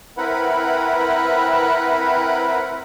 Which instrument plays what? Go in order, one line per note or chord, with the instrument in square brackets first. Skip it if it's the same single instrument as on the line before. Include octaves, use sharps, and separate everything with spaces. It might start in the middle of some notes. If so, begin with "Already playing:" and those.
[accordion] C4 E4 A#4 B4 F#5 B5